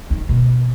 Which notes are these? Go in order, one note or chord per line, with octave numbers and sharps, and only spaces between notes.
D#3
B2